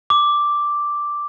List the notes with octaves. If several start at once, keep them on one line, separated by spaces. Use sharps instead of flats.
D6